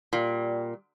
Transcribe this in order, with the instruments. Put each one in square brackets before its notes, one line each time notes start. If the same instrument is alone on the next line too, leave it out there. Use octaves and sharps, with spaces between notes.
[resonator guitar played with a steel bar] A#2 [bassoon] G3